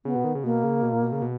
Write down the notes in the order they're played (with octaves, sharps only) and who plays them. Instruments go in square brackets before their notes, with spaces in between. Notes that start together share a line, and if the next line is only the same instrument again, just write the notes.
[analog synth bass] C#3 [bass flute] B3
[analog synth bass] B2
D#3
C#3
[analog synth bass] B2 [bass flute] A#3
[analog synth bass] C#3
B2
A#2
B2
C#3
B2